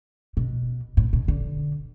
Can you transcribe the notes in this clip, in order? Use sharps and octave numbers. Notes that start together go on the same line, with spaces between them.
B2
A2
B2
D3